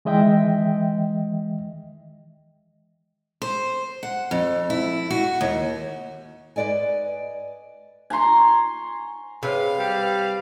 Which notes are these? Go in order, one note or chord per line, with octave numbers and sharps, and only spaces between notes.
D#3 E3 G#3 D#5 E5 G5
C5
F#5
F2
E4
F#4
D#2
B4 C5 D5 D#5 G#5
G#5 A#5 C6 C#6
C3 G#4 B4 C#5 F5
G3